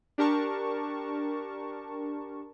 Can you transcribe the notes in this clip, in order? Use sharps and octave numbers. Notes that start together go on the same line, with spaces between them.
D4 G4 A#4 A5 C#6